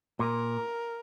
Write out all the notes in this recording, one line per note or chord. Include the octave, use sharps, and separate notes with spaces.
A#2 A#4